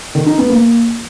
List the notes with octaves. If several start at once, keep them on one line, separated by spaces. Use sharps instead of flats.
D#3
D#4
B3
A#3